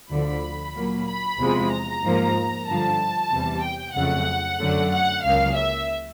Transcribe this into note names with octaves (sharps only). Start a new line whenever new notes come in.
D2 D3 F3 B5
A#2 F#3 A#3
B5
E2 C3 F3 G#3
A#5
G#2 F3 A#3
G2 D3 F3 A5
E2 C3 E3 G3
G5
F2 C#3 F#3 A3 F#5
F#2 D3 F#3 A3
F#5
C#2 C#3 F#3 A#3 F5
E5